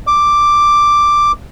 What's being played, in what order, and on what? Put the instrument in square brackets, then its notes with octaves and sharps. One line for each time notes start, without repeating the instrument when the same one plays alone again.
[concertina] D6